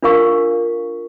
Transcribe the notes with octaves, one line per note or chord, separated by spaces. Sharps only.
D4 F4 A#4 F5 C#6